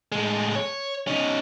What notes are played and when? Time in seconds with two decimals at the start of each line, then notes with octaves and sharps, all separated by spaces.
0.12 A2 G#3
0.55 C#5
1.07 C#4 D#4